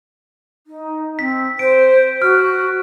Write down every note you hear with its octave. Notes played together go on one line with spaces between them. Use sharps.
D#4
C4 B6
C5 D7
F#4 F6